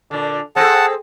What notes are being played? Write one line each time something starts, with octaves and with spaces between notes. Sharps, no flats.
A#2 D3 D4
C4 G#4 A4 F#5 A5